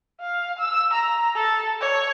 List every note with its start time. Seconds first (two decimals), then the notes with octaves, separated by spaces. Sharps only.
0.21 F5
0.59 E6
0.93 A#5
1.35 A4
1.81 C#5